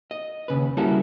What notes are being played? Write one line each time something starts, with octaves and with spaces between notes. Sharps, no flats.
D#5
D#2 C#3 B4
G3 A#3 C#4 E4 F#4 A4